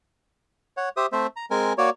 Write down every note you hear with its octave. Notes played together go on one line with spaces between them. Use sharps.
C#5 F#5
G4 C5 E5 D#6
A3 C4 C5 E5
A#5
G#3 C4 A#4 G#5
A#3 F#4 C#5 D5